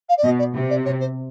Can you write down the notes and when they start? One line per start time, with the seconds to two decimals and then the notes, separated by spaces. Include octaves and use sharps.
0.09 F5
0.17 D5
0.24 B2 D#5
0.38 D5
0.54 C3
0.70 D5
0.85 C#5
1.00 C5